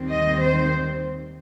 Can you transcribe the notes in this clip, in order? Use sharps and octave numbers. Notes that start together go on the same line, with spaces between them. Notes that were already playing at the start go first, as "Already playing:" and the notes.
Already playing: D#2 D#3 G3 C4
D#5
C5